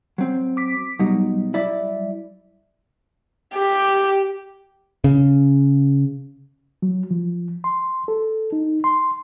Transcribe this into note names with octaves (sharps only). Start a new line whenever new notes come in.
F#3 C4
D6 B6
B2 F#3 G3 D#4
E4 D5
G4
C#3
F#3
F3
C6
A4
D#4
C6